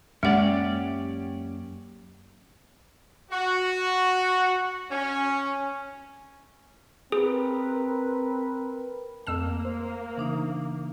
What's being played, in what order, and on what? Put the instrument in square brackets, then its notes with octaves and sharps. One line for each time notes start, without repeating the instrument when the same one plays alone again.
[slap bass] F#2 A#3 [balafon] G#3 F#5 [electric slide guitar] C#4 G4 D5
[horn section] F#4
C#4
[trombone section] C4 A#4 B4 [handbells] G#4
[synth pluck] F2 E6 E7 [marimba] A3 [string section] A#3
[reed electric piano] C5
[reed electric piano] C#3 [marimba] E3 D4 D#4